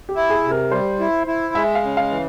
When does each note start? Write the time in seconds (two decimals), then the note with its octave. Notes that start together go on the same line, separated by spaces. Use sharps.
0.09 G4
0.15 E4
0.30 G#4
0.44 C3
0.51 A#4
0.71 G3 C5
0.99 E4
1.27 E4
1.55 G#3 E5
1.75 F5
1.82 C#3
1.97 F5
2.10 E3